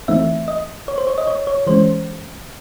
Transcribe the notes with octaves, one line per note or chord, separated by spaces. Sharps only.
E3 A3 C4 D#4 E5
D#5
C#5
C5
C#5
D#5
C#5
C#5
E3 G#3 C#4 C5